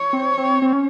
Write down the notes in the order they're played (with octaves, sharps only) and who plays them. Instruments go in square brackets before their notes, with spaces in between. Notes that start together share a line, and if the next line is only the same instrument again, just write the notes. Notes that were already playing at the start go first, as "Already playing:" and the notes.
Already playing: [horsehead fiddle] C#5
[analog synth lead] C4
C4
C4
C#4